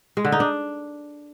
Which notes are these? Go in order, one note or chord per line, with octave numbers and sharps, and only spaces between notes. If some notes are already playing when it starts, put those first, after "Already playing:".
G#3
D3
D#4
D4